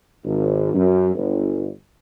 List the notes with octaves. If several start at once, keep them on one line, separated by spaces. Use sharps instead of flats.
G#1
F#2
G1